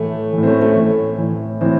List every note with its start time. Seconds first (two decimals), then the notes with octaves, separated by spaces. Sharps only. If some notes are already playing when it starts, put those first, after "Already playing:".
Already playing: A2 E3 A3
0.33 E3
0.38 A2 C4
0.47 A3 C#4
0.62 A3
0.76 A2 E3
1.18 A2 E3
1.61 A2 E3 C4